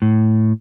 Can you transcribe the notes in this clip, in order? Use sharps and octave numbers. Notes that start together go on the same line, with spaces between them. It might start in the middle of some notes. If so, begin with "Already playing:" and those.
A2